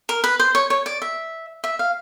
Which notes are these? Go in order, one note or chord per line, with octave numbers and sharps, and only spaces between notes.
A#4
B4
C5
C#5
C#5
D5
E5
E5
F5